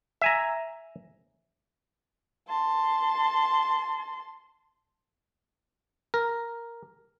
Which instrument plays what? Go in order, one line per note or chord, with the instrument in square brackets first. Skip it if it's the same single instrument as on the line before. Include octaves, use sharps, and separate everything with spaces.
[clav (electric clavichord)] E5 G#5 A#5
[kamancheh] A5 C6
[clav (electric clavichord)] A#4